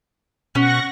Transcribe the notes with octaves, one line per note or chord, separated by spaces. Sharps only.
B2 C#4 F#5 C#6 A#6